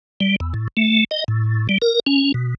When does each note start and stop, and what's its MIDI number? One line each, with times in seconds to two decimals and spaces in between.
0.20 0.36 55
0.40 0.53 40
0.54 0.68 45
0.77 1.04 57
1.11 1.24 75
1.28 1.67 45
1.69 1.78 55
1.82 2.00 70
2.06 2.32 61
2.34 2.54 47